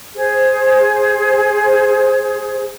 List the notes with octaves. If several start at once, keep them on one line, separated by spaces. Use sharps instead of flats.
G#4 C5